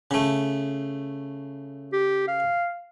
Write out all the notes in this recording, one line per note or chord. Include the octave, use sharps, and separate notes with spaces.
C#3 A3
G4
F5